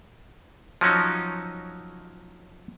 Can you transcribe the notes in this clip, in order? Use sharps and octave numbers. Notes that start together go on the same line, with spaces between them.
F3 F#3 C#4 D#4